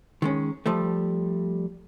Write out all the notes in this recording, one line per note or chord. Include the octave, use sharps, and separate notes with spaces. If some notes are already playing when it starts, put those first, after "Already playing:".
D#3 G#3 C#4
F3 G3 A3